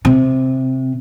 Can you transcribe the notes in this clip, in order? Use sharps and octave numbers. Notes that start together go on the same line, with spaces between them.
C3